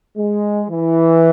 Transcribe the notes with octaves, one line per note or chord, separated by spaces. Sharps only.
G#3
E3